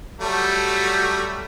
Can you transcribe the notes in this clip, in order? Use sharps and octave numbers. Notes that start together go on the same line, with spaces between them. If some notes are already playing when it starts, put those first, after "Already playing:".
F#3 G3 A3